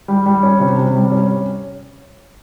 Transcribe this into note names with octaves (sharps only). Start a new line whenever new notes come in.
G3
G3
C#4
C3
C3
G3
C#4